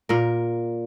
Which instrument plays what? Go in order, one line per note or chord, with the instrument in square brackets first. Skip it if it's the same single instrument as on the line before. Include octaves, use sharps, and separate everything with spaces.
[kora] A#2 A#4